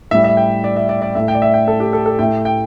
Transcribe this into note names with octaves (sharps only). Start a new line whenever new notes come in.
A2 G3 E5
E5
G5
D5
E5
D5
D5
A2 A3 E5
G5
D5
E5
G5
A4
G4
A4
A4
A2 A3 G5
G5